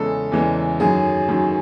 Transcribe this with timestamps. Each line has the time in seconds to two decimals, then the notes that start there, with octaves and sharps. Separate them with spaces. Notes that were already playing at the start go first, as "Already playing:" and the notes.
Already playing: E2 C#3 E3 G#3 A4
0.32 E2 C#3 E3 G#3
0.80 F#2 D#3 F#3 G#4
1.29 F#2 D#3 F#3